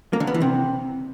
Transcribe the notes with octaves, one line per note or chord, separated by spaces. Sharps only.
A#3
D3
B3
E3
C3